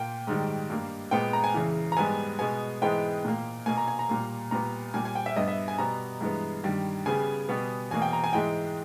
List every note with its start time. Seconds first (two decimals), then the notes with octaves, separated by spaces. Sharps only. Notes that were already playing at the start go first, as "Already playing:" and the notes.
Already playing: A#2 A#3 G5
0.27 G#2 D#3 G3
0.70 G2 G3 A#3
1.11 A#2 G#3 B3 G5
1.33 A#5
1.44 G#5
1.54 E2 C#3 E3
1.92 A#5
1.97 G#2 G3 B3 G#5
2.39 B2 G#3 B3 G#5
2.82 G#2 E3 G#3 B3 G5
3.24 A#2 A#3
3.66 B2 A#3 G#5
3.78 A#5
3.88 G#5
3.99 A#5
4.09 A#2 G3 A#3
4.51 A#2 G3 B3 A#5
4.94 A#2 G3 A#3 G#5
5.05 G#5
5.15 G5
5.26 E5
5.36 G2 G3 B3 D#5
5.48 E5
5.68 G#5
5.78 B2 G3 B3 A#5
6.21 G2 E3 G#3 B3
6.64 G2 D#3 G3
7.06 C#3 G3 B3 G#5
7.49 B2 G3 B3
7.91 E2 B2 A#3 G#5
8.02 G5
8.13 A#5
8.24 G#5
8.33 G#2 E3 G#3 G5